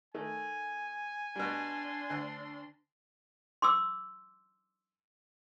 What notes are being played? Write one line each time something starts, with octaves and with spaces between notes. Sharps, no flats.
D#3 A3 G#5
B2 G3 D4 C6
D2 F#6
C6 D6 E6